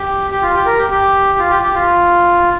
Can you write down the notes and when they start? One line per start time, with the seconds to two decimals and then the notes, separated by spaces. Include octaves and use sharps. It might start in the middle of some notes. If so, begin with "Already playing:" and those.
Already playing: G4
0.31 G4
0.42 F4
0.55 G4
0.66 A#4
0.78 G4
0.90 G4
1.39 F4
1.50 G4
1.63 G4
1.74 F4